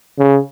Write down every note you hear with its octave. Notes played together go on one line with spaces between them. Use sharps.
C#3